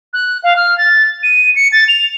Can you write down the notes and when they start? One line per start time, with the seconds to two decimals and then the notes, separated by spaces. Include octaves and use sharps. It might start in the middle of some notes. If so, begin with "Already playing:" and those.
0.13 F#6
0.44 F5
0.56 F6
0.78 A6
1.23 D#7
1.55 C#7
1.72 A6
1.88 F7